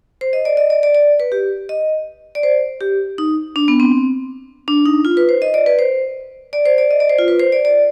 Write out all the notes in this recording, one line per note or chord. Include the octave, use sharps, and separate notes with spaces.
C5
D#5
D5
D#5
D5
D5
D5
B4
G4
D#5
D5
C5
G4
D#4
D4
B3
C4
D4
D#4
F4
B4
C5
D#5
D5
B4
C5
D5
C5
D5
D#5
D5
C5
F4
B4
C5
D5
D5